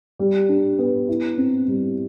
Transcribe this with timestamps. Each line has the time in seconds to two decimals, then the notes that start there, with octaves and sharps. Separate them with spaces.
0.19 G3
0.49 D4
0.79 B3
1.08 E4
1.38 C4
1.68 G3